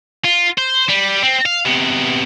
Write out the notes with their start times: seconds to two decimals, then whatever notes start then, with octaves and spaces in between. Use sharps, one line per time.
0.25 F4
0.58 C5
0.89 G3
1.24 C4
1.45 F5
1.66 C3 B3